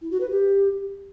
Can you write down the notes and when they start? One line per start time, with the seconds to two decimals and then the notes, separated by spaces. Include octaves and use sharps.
0.01 E4
0.10 F#4
0.20 B4
0.30 G4